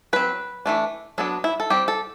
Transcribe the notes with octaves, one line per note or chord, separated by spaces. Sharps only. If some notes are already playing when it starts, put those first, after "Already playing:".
F#3 C4 B4
E3 A3 D4
F#3 B3 D4 A4
E4
A4
G3 C4 G4
A4